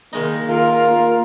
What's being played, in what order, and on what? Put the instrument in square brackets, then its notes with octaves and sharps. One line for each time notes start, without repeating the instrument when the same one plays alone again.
[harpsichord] D#3 G#3 D#4 [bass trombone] A#3
[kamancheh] F4 [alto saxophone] A#4
[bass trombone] A#3